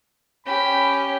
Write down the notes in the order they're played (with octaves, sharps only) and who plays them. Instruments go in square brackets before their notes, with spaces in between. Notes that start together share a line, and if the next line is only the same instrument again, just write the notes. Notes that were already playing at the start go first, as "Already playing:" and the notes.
[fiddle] C#4 [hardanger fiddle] G4 [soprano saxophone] B5